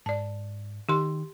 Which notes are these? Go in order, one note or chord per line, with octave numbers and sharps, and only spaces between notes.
G#2 D5 A5
D#3 G4 C6